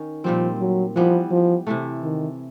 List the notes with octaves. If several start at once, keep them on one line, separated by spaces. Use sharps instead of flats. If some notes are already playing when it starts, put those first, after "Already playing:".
Already playing: D#3 C#4
A#2 F3 G3 C4
F#3
E3 F3 G3 B3
F3
C3 E3 A3
D#3